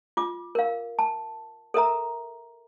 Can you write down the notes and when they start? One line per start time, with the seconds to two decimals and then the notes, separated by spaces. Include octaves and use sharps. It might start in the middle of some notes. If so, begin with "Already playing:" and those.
0.17 F4 D6
0.55 A#4 F5
0.99 A5
1.74 A4 A#4 E5 A#5